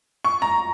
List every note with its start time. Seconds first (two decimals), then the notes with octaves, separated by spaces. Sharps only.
0.25 C#6
0.42 A#5